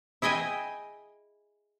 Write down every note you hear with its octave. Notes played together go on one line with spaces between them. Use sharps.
E4 G#4 D#5 G5 G#5